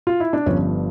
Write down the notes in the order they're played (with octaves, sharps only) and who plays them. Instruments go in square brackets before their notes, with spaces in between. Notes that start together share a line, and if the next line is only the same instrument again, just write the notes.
[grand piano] F4
E4
D4
G1 G2 F3 C#4